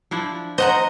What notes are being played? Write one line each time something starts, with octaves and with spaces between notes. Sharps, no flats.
F3 D4 E4
C5 D#5 F#5 A#5